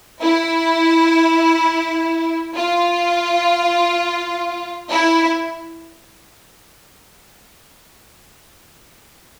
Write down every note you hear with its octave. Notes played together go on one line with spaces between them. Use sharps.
E4
F4
E4